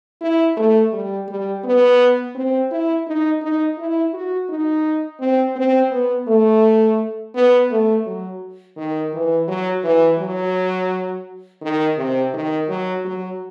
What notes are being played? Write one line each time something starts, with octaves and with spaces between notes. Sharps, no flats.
E4
A3
G3
G3
B3
C4
E4
D#4
D#4
E4
F#4
D#4
C4
C4
B3
A3
B3
A3
F#3
D#3
E3
F#3
E3
F#3
D#3
C3
D#3
F#3
F#3